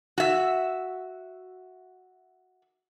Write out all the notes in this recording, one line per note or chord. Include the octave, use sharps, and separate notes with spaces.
F#4 E5